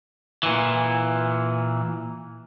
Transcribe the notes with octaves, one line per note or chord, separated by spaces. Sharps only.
A#2 E3